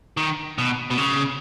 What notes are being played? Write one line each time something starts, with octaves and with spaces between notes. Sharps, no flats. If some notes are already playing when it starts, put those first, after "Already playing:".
D#3
B2
B2
C#3